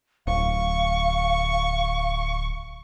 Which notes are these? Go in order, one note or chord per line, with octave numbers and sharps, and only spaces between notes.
D1 F5 C#6